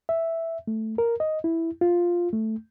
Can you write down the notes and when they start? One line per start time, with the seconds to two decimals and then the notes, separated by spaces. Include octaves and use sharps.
0.09 E5
0.67 A3
0.98 A#4
1.20 D#5
1.44 E4
1.81 F4
2.33 A3